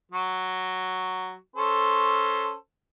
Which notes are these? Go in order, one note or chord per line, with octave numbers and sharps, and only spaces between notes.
F#3
C#4 A4 C5